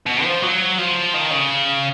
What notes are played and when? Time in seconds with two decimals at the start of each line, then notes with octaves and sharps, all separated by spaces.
0.07 B2
0.24 F3
0.42 F#3
0.78 F3
1.14 D#3
1.31 C#3